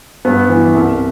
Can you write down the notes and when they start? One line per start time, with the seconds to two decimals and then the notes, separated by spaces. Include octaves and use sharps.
0.25 G2 B3
0.49 E3
0.74 C2